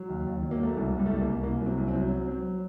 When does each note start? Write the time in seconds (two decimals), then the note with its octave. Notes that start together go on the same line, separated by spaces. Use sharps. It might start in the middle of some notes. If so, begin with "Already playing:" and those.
Already playing: F#3
0.09 D#2
0.26 D#2
0.42 F#3
0.51 A#3
0.59 F#3 A3
0.76 C2 G3
0.93 C2
0.99 G3
1.06 A3
1.10 C2 G3
1.21 A#3
1.27 C2
1.43 C2 A#3
1.60 F#3
1.66 C4
1.77 C2
1.88 C4
1.94 F#3
2.11 F#3
2.28 F#3